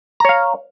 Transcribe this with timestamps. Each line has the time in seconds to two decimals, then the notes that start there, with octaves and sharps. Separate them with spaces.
0.20 A#5
0.25 C#5
0.29 F5